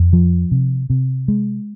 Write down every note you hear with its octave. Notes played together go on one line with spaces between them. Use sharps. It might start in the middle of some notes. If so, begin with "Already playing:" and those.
Already playing: F2
F3
C3
C3
G#3